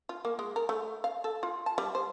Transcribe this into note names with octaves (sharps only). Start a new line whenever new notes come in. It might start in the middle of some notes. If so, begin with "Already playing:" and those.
F4
A#3
G#3
A#4
A3
F5
A4
F4
A5
G3
C5